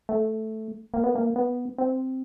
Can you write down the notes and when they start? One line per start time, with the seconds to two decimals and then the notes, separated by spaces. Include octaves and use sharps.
0.09 A3
0.94 A#3
1.04 B3
1.15 A#3
1.36 B3
1.78 C4